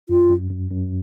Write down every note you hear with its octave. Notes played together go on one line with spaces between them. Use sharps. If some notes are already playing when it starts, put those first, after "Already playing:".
F#2 F4
F#2
F#2
F#2